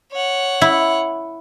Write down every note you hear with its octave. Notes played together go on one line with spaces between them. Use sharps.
C#5 F#5
E4